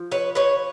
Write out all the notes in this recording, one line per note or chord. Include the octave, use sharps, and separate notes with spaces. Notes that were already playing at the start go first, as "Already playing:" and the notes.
Already playing: F3
B4 C#5
B4 C#5